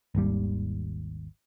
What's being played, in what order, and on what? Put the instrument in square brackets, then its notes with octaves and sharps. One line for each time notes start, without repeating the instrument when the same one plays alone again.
[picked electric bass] G#1 D#2 G3